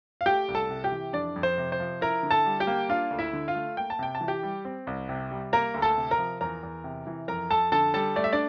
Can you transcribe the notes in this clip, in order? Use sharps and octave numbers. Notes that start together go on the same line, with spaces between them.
F5
A3 G4 G5
C2
A4 A5
C3
G4 G5
E3
F2 D4 D5
F2
C5
C3
C5
F3
E4 A#4 A#5
D3
A4 A5
G3
G4 G5
A#3
D4 F4 F5
D2
E4 E5
D3
F4 F5
A3
A#3 G5
A5
C3 G5
A5
E3
G4 G5
G3
C4
C2
C3
G3
A#3 A#4 A#5
D2
A4 A5
C3
A#4 A#5
F3
E2 A#4 A#5
E2
C3
E3
F2 A#4 A#5
F2 A4 A5
D3 A4 A5
G3 A4 A5
A3 D5
E5
D4 D5